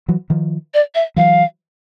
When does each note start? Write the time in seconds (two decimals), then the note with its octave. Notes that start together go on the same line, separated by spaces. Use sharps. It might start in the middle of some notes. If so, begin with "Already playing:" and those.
0.08 E3 F#3
0.30 D#3 F3
0.74 D5
0.95 E5
1.16 E3 F#3 F5